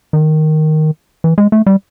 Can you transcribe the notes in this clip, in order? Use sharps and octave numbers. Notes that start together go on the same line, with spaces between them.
D#3
E3
G#3
A3
G3